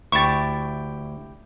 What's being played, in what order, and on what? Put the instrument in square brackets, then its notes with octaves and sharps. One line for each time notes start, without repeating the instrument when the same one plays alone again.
[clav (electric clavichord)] D2 [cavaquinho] E4 G4 [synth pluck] C#6 A6